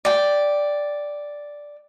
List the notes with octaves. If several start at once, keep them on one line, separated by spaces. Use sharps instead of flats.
D5 G5